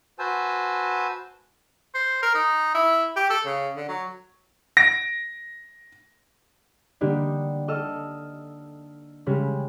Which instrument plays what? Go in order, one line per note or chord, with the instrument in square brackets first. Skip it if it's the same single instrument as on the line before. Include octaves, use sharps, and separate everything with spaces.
[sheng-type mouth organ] F#4 B4 C5 G#5 A5 E6
[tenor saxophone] C5
A#4
D#4
E4
G4
A4
C#3
D3
F#3
[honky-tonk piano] A#6 D7
[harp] D3 G3 A#3 D4 D#4
A4 D#5 E6 F6
C#3 G3 G#3